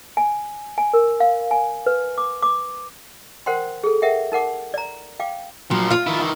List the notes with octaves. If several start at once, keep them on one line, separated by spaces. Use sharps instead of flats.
G#5
G#5
A#4
F5
G#5
B4
D6
D6
A#4 C5 F#5 G5 C6
G#4 A4
A#4 E5 F#5 G5
D#4 A#4 F#5 D6
D5 A#5
F5 G5 D6
A#2 F3 F#3
F4 F5
D#3 E4
D#3 E3